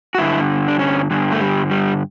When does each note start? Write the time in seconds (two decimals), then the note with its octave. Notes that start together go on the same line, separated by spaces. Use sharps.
0.15 F#4
0.18 G2 D3 E4
0.68 D4
0.79 C#4
1.11 G2 D3
1.32 A3
1.41 G3
1.71 G3